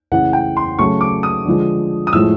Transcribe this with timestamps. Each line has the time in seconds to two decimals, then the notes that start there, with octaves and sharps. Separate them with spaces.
0.12 C#3 E3 A3 F#5
0.33 G5
0.57 C6
0.79 C#3 F#3 A3 C#6
1.01 D6
1.23 D#6
1.45 D3 F3 G#3
2.07 D#6
2.13 A2 F3 G#3 E6